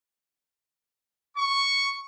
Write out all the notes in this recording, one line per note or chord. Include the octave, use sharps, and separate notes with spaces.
C#6